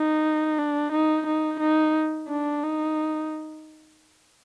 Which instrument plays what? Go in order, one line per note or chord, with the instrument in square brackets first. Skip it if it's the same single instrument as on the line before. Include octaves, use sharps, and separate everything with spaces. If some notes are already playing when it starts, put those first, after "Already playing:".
Already playing: [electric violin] D#4
D4
D#4
D#4
D#4
D4
D#4